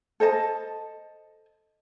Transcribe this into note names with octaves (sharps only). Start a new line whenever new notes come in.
A4 C5 D#5 A5